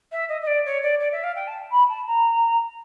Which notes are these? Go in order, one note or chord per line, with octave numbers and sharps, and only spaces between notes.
E5
D#5
D#5
D5
C#5
D5
D5
E5
F5
G5
A5
B5
A5
A#5